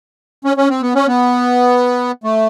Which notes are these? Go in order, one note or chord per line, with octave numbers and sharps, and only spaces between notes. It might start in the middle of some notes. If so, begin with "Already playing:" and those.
C#4
C#4
C4
B3
C#4
B3
A3